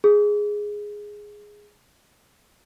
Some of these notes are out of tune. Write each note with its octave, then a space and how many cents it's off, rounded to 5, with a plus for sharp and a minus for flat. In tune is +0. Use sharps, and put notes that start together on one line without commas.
G#4 +0